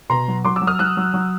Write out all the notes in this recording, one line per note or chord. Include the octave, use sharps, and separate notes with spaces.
B2 A#5 C6
F#3
F#3 C6 D6
D6 E6
F#3
D#6 F6
F#3 E6 F#6
F#3
F#3